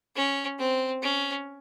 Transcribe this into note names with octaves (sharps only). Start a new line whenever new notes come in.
C#4
C4
C#4